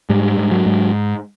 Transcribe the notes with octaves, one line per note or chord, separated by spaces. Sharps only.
G#2 G3
G#2
F#3
G#2